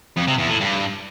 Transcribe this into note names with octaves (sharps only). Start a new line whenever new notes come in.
F2
C3
E2
A2
G2